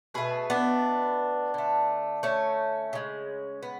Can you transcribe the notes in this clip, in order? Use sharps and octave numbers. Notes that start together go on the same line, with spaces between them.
B2 A3 G#4 B4
B3 D4
D3 A3
A3 C#4
C#3 G#3
B3